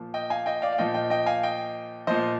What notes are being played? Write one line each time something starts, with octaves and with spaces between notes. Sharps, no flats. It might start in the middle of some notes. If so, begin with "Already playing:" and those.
Already playing: A#2 F3
D#5 G5
F5 G#5
D#5 G5
D5 F5
F5
A#2 F3 D#5 G5
D#5 G5
D#5 G5
F5 G#5
D#5 G5
A#2 F3 C5 D#5